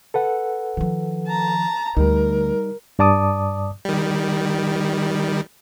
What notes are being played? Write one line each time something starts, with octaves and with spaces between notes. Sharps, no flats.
A4 B4 F#5
D#3 F3
A5 A#5
D2 G3 D#4 A#4
G2 D5 A5 D6 D#6
D#3 G3